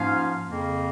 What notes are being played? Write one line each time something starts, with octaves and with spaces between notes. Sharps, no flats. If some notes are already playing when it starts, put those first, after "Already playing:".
Already playing: G#2 F3 A#3 C#4 F4 F5
F2 C#3 A#3